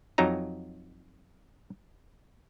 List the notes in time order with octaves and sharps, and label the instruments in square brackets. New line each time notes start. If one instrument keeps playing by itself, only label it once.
[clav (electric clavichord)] F2 F#3 D#4 A#5